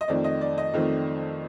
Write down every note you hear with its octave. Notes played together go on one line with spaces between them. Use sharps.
D#5
F2 D#3 A3 C4 D5
D#5
D5
D#5
F2 D#3 A3 C4